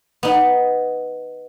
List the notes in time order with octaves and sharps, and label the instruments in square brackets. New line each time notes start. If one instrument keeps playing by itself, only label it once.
[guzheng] B3 D#4